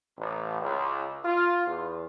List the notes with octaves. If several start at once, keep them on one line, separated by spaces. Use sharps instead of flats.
A1
C#2
F4
E2